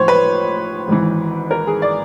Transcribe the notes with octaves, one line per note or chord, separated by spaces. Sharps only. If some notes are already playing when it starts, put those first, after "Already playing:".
Already playing: A1 A2 F3 C5 C#5
B4
G#1 G#2 E3
A#4
G#4
D5